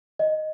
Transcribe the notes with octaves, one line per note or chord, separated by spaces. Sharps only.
D#5